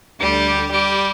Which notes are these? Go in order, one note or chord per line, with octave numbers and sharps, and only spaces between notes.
D2 D3 G3 G4
G3 G4